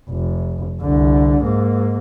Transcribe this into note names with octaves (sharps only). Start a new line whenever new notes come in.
F1
C2 D3
G#2 A#3